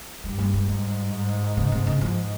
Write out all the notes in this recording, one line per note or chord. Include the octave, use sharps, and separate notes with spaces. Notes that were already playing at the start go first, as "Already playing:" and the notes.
G2 G3
G3
G#3
G#2 G3
G#2
C#3
C3
C#3
G#2 F3